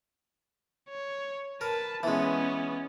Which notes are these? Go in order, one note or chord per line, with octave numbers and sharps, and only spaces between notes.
C#5
A#4 B4 A5
E3 G#3 B3 C#4